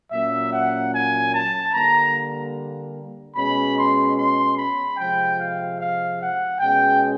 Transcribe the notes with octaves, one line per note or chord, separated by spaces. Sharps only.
A#2 F#3 A#3 C#4 E5
F#5
G#5
A5
D3 G3 A#3 A#5
B2 G#3 C#4 B5
C6
C6
B5
C3 F3 G#3 G5
F5
F5
F#5
B2 G#3 C#4 G5